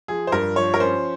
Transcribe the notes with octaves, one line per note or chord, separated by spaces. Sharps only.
F3 G#4
C5
G2 A#4
F3 C#5
A#4
C#4 C5